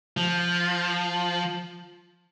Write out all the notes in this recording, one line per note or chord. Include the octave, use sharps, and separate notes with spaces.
F3